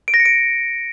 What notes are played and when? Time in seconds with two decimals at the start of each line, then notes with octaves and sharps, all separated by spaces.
0.08 D7
0.14 A#6
0.20 C#7
0.25 D7